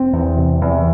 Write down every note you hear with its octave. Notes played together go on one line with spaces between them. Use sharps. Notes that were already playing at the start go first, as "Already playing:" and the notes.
Already playing: F1 C4
E2
C3
E2